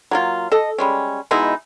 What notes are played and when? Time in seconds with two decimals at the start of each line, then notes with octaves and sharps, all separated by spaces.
0.11 F#3 A#3 F4
0.52 A4 D#5
0.78 G3 G#3 C#4
1.31 B2 G#3 D#4 E4